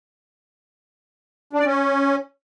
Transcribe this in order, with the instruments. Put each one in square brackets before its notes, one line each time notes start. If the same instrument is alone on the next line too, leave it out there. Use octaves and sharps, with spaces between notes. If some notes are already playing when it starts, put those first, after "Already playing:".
[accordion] D4
D5
C#4